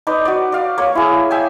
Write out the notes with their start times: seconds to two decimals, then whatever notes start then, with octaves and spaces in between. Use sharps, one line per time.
0.07 D#4 B4 D5
0.25 F#4 D5
0.52 D5 F5
0.78 A#3 C#5
0.95 E4 G#4
1.31 E5 G5 G#5